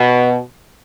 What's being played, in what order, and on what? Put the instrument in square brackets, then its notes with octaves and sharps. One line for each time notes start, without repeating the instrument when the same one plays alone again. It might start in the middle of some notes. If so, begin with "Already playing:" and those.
Already playing: [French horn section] B2